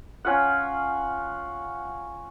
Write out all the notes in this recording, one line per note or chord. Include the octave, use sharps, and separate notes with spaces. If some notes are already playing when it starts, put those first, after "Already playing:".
C#4 F4 F#5